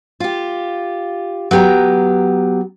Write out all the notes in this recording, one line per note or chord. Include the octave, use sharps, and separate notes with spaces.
F4 G4
F#3 B3 G4 G5 A#5